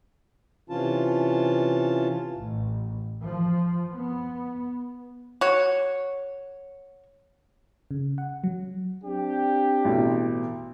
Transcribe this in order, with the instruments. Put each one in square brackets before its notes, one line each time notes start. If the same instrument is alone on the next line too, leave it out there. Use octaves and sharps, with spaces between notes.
[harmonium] C3 E3 C#4 F4 A5
[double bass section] A1
F3
B3
[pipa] F#4 C#5
[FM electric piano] C#3
F#5
F#3
[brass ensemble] C4 D4 G4
[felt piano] A1 B2